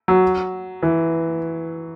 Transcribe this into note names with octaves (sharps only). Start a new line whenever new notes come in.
F#3
E3